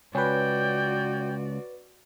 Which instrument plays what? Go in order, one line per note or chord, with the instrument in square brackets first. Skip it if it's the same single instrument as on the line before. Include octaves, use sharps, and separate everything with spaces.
[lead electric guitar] C#2 [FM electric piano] C#4 B4 [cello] F#4 D5 [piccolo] G5